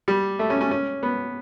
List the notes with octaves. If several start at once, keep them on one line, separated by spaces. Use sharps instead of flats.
G3
A3
C#4
C#4
C#4
B3